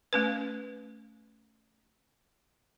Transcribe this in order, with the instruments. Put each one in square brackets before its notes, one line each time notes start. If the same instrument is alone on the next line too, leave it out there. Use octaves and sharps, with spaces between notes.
[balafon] A3 C#4 B4